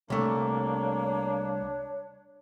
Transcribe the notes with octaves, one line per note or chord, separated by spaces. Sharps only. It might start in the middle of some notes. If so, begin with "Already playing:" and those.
C2 A3 A#3 D4 C#5